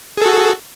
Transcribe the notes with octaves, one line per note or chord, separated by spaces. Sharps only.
F#4 G#4 A4